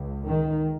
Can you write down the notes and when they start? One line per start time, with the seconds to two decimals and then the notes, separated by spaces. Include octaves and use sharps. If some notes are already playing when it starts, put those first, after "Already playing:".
Already playing: C#2
0.24 D#3